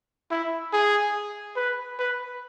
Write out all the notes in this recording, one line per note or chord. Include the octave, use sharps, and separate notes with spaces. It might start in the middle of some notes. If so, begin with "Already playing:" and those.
E4
G#4
B4
B4